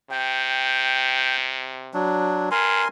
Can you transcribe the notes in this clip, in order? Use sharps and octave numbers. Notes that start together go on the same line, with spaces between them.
C3 G5
F#3 D4
G2 A#4 G#5 C6